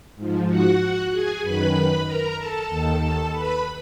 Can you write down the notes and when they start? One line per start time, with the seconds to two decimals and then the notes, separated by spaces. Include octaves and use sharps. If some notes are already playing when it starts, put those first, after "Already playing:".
0.16 G#2 F3
0.48 F#4 F#5
1.11 G#4 G#5
1.42 F#2 D#3 B4 B5
2.05 A#4 A#5
2.37 A4 A5
2.69 D#2 D#3
3.00 A4 A5
3.32 B4 B5